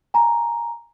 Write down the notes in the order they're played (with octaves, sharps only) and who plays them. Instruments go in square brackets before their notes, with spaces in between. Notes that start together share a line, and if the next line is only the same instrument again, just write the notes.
[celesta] G#5 A#5